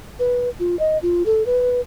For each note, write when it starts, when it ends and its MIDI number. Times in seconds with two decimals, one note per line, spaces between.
0.19 0.49 71
0.60 0.78 65
0.79 0.98 75
1.02 1.25 65
1.26 1.45 69
1.46 1.81 71